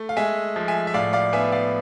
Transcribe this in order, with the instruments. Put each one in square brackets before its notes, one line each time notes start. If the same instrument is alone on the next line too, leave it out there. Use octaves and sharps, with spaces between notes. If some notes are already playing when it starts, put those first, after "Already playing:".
Already playing: [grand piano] A3
F5
G#3 E5 G#5
F3
E5 G#5
E5
A2 D5 F5
D5 F5
B3 E5 G#5
D5 F5